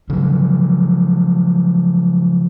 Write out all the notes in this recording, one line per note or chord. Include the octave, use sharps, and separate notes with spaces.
C#3 F3 F#3